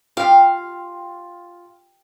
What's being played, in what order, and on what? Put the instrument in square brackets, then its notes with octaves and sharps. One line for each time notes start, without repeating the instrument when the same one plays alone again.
[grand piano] F4 [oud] G4 [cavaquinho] F5